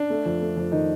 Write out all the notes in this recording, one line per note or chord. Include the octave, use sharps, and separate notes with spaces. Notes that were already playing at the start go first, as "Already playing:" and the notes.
Already playing: D4
A3
F2
A3
F2
D#3 D#4